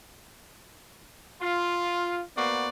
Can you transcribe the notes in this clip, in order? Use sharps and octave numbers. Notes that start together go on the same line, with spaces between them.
F4
A#3 B3 F#4 C5 D5